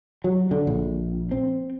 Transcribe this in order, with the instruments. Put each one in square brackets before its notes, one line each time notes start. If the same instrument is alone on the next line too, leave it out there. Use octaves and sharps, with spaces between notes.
[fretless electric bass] F#3
D3
A#1
C4